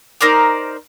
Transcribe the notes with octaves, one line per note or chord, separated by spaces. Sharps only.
D#4 A#4 C5 D5